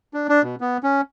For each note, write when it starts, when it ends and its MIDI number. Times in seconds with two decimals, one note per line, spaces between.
0.14 0.27 62
0.29 0.42 62
0.43 0.55 47
0.61 0.77 59
0.83 1.01 61